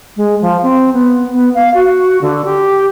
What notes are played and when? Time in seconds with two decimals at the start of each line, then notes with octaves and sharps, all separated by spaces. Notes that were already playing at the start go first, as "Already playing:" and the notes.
0.17 G#3
0.41 F3
0.62 C4
0.93 B3
1.33 B3
1.54 F5
1.74 F#4
2.21 D3
2.45 G4